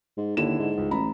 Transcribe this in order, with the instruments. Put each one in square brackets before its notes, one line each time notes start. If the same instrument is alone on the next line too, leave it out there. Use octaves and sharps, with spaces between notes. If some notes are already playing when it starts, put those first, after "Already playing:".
[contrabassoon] G#2
[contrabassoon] D#2 [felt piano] D3 E4 E7
[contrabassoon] G#2
[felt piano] C#2
[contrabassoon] A1 [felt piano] A#5 B5